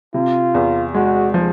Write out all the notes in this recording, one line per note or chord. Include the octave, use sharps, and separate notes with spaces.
C3 F4
E2
G#3 F#4
F3